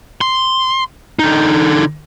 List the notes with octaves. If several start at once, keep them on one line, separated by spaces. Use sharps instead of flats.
C6
D3 D#4